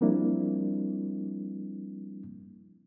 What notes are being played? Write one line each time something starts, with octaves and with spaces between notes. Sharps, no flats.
F3 G3 A#3 C4 D4 E4